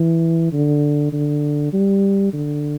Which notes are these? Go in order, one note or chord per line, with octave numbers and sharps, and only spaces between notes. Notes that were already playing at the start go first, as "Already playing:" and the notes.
Already playing: E3
D3
D3
G3
D3